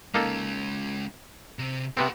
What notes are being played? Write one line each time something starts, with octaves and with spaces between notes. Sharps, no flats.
G#3 A#3 C#4 D#4 A4
C3
C3 B3 C4 G4 F#5